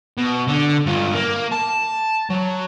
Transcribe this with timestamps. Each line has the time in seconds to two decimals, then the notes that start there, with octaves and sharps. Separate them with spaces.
0.18 B2
0.48 D3
0.86 G2 F4
1.14 A#3
1.52 A5
2.30 F#3